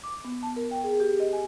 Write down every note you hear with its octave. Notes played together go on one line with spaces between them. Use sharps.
D6
B3
A5
A#4
G5
G#4
G4
D#5
G#5